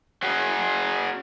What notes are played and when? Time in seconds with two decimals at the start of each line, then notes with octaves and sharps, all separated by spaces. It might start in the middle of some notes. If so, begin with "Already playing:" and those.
0.23 C#4 F#4 G#4